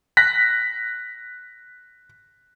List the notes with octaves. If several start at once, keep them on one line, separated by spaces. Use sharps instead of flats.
F#6 A#6 B6